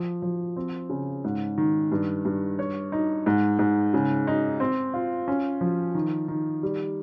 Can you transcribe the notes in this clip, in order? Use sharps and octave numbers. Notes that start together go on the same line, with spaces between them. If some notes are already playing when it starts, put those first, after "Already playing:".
Already playing: F3
F3
C4
C#3
G#2
D#3
G2
G2
C#5
D#4
G#2
G#2
C#3
D#4
C4
F4
C#4
F3
D#3
D#3
G3